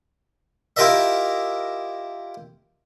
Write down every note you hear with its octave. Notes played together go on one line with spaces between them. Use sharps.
E4 F4 G4 A#4 D#5 E5